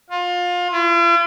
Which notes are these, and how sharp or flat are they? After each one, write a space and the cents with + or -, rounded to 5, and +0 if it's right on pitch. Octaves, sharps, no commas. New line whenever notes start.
F4 +25
F4 -45